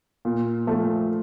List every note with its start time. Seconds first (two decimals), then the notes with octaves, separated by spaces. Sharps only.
0.25 A#2
0.67 F3 A3